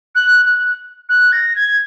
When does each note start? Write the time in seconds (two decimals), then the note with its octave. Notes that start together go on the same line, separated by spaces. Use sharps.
0.15 F#6
0.45 F#6
1.09 F#6
1.32 A#6
1.55 G#6